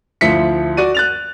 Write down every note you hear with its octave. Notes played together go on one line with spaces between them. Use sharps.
D2 F3 E4 B6 C#7
F#4 D5 D#7
F#6 A6 F7